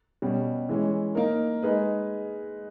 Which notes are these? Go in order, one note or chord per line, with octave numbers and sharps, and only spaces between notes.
B2 G3 C#4
E3 G#3 C#4
A#3 D#4 A#4
G#3 D#4 G#4 B4